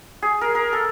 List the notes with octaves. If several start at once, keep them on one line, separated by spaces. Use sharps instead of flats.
G#4
A#4
A#4
A4